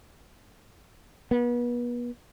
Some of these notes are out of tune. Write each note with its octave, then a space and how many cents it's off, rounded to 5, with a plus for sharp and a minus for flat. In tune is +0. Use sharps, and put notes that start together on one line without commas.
B3 -35